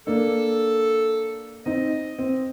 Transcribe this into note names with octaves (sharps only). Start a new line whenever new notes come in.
A#3 D4 A4
C4 D#4 D#5
C4